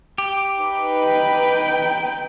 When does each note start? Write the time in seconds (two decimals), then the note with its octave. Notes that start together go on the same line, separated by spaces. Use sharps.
0.18 G4
0.58 D#4 B4
1.05 G5